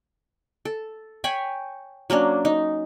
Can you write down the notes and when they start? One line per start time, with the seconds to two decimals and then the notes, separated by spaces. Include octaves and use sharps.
0.65 A4
1.24 C#5 G5 G#5 B5
2.10 F#3 A#3 C#4 D4
2.45 D#4